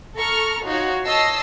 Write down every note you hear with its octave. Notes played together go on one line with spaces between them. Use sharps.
A4 A#5 C#6 F6
D#4 F4 F#4 C#5
C#5 D#5 A5 E6 A#6 C7